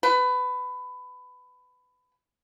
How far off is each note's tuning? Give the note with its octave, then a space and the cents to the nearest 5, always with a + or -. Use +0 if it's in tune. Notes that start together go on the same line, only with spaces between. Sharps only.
B4 +20